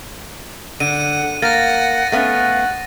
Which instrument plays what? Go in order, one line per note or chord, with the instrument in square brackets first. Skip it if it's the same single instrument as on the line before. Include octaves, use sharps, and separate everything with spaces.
[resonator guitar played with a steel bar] D3 [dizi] F#5 [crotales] D#7
[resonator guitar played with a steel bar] A#3 [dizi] F#5 [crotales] A6 A#6
[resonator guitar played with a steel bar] A3 B3 C#4 [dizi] F5 [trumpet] F#5